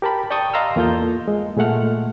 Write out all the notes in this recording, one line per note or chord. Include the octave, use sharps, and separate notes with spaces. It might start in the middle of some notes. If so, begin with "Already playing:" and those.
G4 A#4 A5 B5
D5 G5 A5 C#6 D#6
D#5 F5 A#5 C6 E6 F6
E2 A#3 F4 A4 G6
G#3
A#2 G#3 A3 F#5 F6